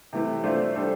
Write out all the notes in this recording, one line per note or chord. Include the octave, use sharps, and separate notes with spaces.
C3 E3 A3
A3 D4 F4 C5
G3 D4 A4 C5